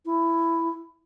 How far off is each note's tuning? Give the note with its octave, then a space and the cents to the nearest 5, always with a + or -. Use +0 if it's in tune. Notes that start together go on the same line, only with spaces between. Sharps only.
E4 +10